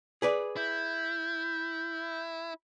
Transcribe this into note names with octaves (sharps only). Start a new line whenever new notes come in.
G#4 B4 D5
E4 G6